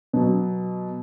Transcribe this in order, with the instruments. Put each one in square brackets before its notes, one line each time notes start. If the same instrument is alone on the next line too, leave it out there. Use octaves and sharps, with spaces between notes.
[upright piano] B2 F#3